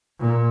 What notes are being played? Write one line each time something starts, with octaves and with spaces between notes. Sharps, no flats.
A#2